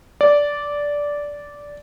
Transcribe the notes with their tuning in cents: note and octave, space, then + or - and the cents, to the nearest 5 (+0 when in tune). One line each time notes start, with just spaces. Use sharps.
D5 -10